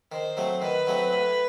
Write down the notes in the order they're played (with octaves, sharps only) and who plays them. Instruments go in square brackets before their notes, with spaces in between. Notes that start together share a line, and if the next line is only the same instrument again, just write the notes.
[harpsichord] D#3 [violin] C5
[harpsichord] F#3 A3 C4
[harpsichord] D#3 [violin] B4
[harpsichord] F#3 A3 C4
A2